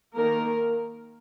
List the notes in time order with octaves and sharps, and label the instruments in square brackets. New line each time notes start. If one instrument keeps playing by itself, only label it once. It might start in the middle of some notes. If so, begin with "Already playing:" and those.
[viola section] D#3 A#3 A#4